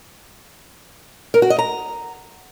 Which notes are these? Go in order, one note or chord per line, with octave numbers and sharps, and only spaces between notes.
A#4
F#4
D#5
A#5